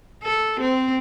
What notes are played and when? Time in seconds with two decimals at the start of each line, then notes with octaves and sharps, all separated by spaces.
0.23 A4
0.60 C4